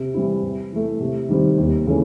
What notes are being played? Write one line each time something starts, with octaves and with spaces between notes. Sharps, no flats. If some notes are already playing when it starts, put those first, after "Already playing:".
Already playing: C3
E3 G3 C4 E4
C3
E3 A3
C3
D#3 G3 C4
D#2
C#3 E3 A3 C#4